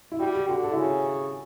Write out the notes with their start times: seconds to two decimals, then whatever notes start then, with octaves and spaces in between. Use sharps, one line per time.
0.12 E4
0.20 G3 F#4
0.35 G4
0.49 D3 F#4
0.63 A4
0.71 E4
0.77 C#3 F#4